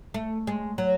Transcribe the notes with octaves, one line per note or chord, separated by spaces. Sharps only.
A3
G#3
F#3